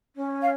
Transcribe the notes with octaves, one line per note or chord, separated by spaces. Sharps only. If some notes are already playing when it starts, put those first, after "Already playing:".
C#4
F5